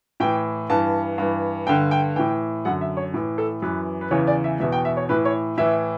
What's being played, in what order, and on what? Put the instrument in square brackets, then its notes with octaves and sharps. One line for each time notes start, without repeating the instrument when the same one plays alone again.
[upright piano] A2 E3 G5
G2 E3 A5
G2 E3
G2 D3 G5
G5
A2 E3 G5
F#2 D3 F#5
E5
C#5
A2 E3
A4
F#2 E3 B4
B4
E2 C#3 E3 C#5
D5
E5
E2 B2 E5
G5
E5
C#5
A2 E3 B4
C#5
A2 E3 E5